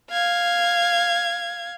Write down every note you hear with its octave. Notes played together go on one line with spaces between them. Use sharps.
F5 G#6